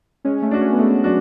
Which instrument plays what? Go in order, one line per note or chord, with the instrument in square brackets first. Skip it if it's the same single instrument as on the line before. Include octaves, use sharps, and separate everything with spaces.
[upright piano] G#3 [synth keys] C#4
[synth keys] A3
[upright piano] D4 F#4
[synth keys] C#4
B3
[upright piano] G#3 [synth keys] A3
[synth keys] F#3 [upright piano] D4 F#4